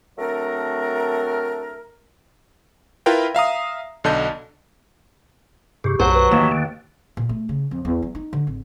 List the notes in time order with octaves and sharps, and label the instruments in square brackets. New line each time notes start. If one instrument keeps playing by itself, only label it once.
[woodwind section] F#3 A3 C4 D4 A#4
[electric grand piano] E4 F4 A#4 B4 G5
E5 F5 A#5 D#6
B1 D3 D#5 A5 G6
[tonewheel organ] G2 C3 [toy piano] G4 G#4
[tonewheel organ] B1 F#2 F#5 [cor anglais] F#3 [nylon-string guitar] C5
[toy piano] B4
[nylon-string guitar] D#2 [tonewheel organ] E3
[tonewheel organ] D3
[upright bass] A#2
A3
C#3
F2
E2
F#3
D#4
D3
G#1